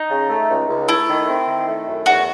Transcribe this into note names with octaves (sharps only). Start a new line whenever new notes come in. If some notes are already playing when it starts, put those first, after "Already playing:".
Already playing: D#4
C#3
A3
C#2
C#2
A3 E4
D#3
C4
D#3
A3
F#2
E2 F#4